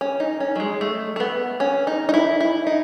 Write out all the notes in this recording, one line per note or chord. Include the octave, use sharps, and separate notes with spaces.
C#4
D#4
C#4
F#3
G#3
A3
A3
B3
C#4
D#4
D#4
E4
E4
D#4